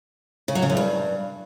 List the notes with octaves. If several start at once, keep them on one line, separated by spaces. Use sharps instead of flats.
C#3
F#3
C#3
F#2
G2